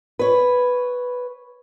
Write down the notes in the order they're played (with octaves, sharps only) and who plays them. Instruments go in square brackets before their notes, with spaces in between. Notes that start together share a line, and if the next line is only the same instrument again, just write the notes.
[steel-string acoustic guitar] B4 C#5